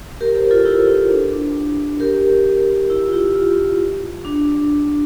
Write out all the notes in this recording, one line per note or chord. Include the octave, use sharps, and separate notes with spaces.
G4 A#4
A4 C5
F4 A4
E4 G4
E4
E4
D4
D4
G4 A#4
E4 G4
F4
E4 G4
F4
D4